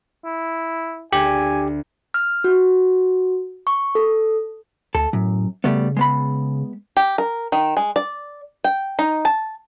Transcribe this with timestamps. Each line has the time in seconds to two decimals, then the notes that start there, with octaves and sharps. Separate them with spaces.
0.25 E4
1.13 D2 G4 G#5
2.14 F6
2.44 F#4
3.67 C#6
3.95 A4
4.95 D2 A4
5.13 F#2 A2
5.64 C#3 G3 A3 B3
5.97 G#3 B3 B5
6.97 G4
7.18 A#4
7.52 D#3
7.77 G#3
7.96 D5
8.64 G5
8.99 D#4
9.25 A5